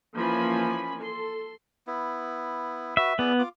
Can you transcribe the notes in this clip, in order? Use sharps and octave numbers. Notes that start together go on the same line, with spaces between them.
E3 F3 A#3 C#4 G#5 B5
A4 C6
B3 E4
F#4 B4 E5
B3 E4 G#4 D5
F4 D6